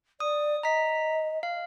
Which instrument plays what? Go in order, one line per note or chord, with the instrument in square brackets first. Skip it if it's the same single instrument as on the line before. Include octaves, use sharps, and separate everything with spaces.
[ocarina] D5 [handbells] D#6
[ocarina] D#5 [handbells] A#5 B6
[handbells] F5